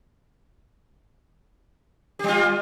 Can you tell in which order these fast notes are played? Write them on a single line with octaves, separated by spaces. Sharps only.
G4 G3 F4